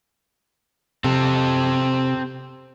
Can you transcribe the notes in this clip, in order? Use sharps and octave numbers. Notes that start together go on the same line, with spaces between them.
C3 C4 A4